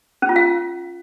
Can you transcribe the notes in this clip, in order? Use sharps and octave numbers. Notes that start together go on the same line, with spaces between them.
C#4
F4
F5